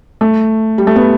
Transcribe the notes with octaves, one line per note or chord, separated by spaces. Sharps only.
A3
G3
A3
B3